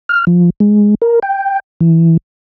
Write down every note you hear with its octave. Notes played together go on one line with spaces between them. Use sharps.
F6
F3
G#3
A#4
G5
E3